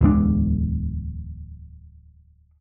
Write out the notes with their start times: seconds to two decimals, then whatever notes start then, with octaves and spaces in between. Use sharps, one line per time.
0.01 D1 E2 G#3 D4